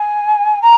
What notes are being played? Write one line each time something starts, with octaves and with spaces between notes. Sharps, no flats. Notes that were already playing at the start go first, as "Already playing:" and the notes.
Already playing: G#5
A#5